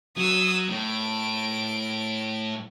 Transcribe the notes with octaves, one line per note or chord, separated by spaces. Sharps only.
F#3 D#6 E6
A2 D7